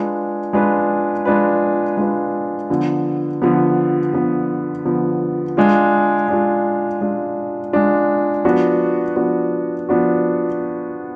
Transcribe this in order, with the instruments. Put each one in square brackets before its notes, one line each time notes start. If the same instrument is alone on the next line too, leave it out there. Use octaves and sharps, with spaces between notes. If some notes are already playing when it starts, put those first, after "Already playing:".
Already playing: [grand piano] G#3 D4 F4 B4
G#3 D4 F4 B4
G#3 D4 F4 B4
G#3 D4 F4 B4
D3 F3 B3
D3 F3 B3
D3 F3 B3
D3 F3 B3
G#3 D4 F4
G#3 D4 F4
G#3 D4 F4
G#3 D4 F4
F3 B3 D4 F#4
F3 B3 D4 F#4
F3 B3 D4 F#4